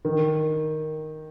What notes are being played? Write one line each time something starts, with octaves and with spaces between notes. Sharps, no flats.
D#3